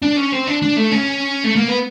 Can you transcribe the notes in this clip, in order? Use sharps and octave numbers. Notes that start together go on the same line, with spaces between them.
D4
C#4
C4
D4
D4
A3
C#4
A3
A#3
B3